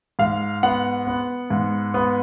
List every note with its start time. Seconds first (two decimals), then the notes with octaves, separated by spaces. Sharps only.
0.19 G#2 F5
0.63 B3 F#5
1.07 B3
1.50 G#2
1.94 B3